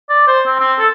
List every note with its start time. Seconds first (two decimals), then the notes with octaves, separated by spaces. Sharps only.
0.09 D5
0.28 C5
0.47 C4
0.60 C4
0.79 A4